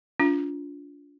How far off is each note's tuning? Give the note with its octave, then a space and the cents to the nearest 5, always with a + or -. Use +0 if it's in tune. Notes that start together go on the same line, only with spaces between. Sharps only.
D4 -35 F4 +0